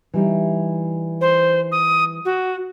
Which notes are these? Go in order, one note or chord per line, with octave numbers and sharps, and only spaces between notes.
E3 G3 D#4
C5
D#6
F#4